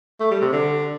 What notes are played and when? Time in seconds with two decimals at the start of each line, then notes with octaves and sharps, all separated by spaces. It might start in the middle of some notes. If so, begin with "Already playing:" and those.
0.20 A3
0.31 G3
0.42 C3
0.53 D3